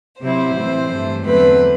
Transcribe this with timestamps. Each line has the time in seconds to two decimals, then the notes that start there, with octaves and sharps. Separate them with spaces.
0.21 C3 F#3 C4 E4 C5
0.55 A2 E3 A3 C4 E4
0.89 G2 E3 A3
1.24 E2 D3 F#3 A3 C4 B4